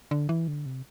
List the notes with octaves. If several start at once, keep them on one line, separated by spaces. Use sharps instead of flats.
D3
E3
D3
C3